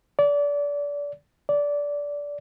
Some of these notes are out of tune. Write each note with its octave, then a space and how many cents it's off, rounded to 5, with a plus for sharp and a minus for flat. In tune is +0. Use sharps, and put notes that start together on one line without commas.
D5 -30
D5 -20